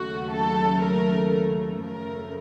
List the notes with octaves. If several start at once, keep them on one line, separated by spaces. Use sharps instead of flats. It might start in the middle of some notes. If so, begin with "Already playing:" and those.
Already playing: D#2 C#3 F#3 A3 F#4
A4
A#4
F#2 C#3 F3 A3 A#4